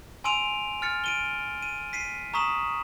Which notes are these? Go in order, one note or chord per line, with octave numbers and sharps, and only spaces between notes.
G#5 C6 E6 D7 D#7 F7
F6 A6 C#7
D7 D#7 G7
D#7
B6 C7 D#7
A#5 C#6 D#6 B6 E7 F#7